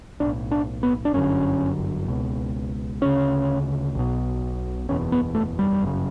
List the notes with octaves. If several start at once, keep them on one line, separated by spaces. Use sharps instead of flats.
B1 A2 D4
D4
B3
D4
G1 F#2 D3 C#4
C#2 B2
D2 C#3 C#4
B1 B2
F#1 E2 B2 C#4
B3
A3
G3
G1 F#2 C#3